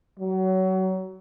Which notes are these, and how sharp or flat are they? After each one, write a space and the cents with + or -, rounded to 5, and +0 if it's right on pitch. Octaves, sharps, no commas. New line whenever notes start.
F#3 +25